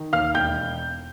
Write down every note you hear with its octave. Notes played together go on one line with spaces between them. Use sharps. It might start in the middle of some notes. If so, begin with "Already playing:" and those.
Already playing: D#3
D#2 F5 F6
E1 G5 G6